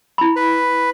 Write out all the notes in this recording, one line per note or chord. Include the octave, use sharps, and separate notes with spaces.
E4 B5
B4